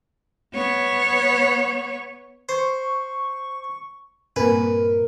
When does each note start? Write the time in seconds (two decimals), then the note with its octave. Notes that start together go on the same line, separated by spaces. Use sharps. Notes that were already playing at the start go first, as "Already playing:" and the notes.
0.54 B3 C#5
2.49 C5 C#6
4.36 G2 A#2 A#3 C4 A#4 B4